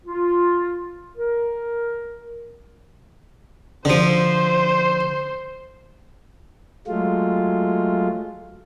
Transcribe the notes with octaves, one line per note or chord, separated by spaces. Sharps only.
F4
A#4
D3 F3 C5
F#3 G#3 A3 F4